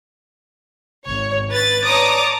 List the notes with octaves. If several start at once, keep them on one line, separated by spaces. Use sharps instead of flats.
G#1 C#5
B4 A6
C#5 D5 A5 A#5 D6 D#6